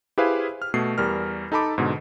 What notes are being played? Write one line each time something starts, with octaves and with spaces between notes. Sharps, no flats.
E4 G4 G#4 B4 C5 F5
F6
B2 A3 C7
E2 G3 A#4 F6
D#4 A4 A5 B5 D6
G#2 B2 D3